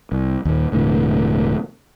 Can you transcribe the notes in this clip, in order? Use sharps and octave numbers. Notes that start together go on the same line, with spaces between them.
C2
D#2 A#2
E1 A2 D3